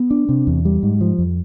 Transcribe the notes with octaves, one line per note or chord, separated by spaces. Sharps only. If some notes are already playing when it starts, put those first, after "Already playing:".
Already playing: B3
D4
C3
E2
G3
G#2
F3
F2